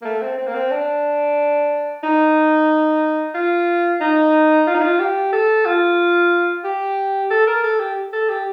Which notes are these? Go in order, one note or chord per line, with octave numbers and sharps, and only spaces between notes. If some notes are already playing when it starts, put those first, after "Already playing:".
A#3
A3
C4
C4
A#3
C4
D4
D#4
F4
D#4
F4
D#4
F4
G4
A4
F4
G4
A4
A#4
A4
G4
A4
G4